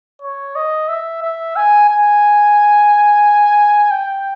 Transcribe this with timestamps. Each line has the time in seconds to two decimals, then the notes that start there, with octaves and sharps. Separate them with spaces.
0.22 C#5
0.56 D#5
0.89 E5
1.22 E5
1.56 G#5
1.89 G#5
3.91 G5